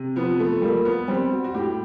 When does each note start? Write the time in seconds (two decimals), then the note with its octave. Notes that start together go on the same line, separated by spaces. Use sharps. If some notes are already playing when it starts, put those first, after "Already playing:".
Already playing: C3
0.16 F3 B3
0.40 A3
0.62 G3 A#3
0.85 B3
1.08 G3 C4
1.31 F#4
1.44 F#4
1.54 A2 G4